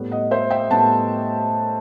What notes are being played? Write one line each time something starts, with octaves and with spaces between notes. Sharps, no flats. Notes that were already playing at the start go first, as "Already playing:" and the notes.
Already playing: A2 G3 B3
D#5 F#5
C5 E5
E5 G5
A2 G3 B3 F#5 A5